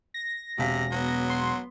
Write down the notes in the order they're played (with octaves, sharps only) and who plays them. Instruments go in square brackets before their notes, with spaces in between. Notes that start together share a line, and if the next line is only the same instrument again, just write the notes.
[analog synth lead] A#6
[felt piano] E1 F5 B6 [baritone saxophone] C3
[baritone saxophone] F#3 [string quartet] B3
[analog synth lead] C6